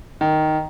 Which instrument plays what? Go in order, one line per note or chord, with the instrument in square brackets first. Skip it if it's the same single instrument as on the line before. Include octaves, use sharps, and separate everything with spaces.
[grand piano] D#3